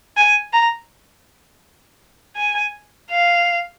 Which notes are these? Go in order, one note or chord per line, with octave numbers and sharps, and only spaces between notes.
G#5
A#5
G#5
F5